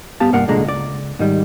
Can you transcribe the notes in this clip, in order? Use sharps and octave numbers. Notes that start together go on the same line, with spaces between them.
G2 B3 G4 F5 A5
C2 G2 A#3 A#4 F#5
C2 A#2 D3 G#3 A#5
C#2 D5
G#2 D#3 G3